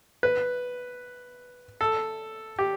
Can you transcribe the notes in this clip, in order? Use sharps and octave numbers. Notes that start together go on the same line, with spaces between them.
B4
A4
G4